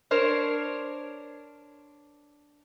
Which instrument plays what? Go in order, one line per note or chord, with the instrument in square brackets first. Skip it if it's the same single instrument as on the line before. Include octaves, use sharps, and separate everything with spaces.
[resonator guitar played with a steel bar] D4 A#4 C5 C#5